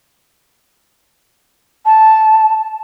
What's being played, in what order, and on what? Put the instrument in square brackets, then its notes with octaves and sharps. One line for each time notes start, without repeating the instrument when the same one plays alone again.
[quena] A5